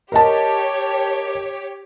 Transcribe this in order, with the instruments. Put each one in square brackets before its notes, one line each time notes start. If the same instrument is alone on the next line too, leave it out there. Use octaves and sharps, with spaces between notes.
[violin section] G4 C#5 [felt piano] A#4 D#5 A5